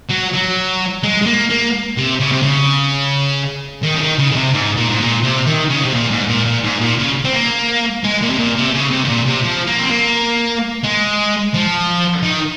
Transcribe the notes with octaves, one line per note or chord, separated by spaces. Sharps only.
F#3
F#3
G#3
G#3
A#3
A#3
C3
C#3
C3
C#3
D#3
C#3
D#3
C#3
C#3
C3
G#2
A#2
G#2
A#2
C3
D#3
C#3
C3
A#2
G#2
A#2
A#2
G#2
A#2
C#3
C4
A#3
G#3
A#2
C3
A#2
C3
C#3
C3
C3
A#2
C3
F3
A#3
C4
A#3
G#3
F3
D#3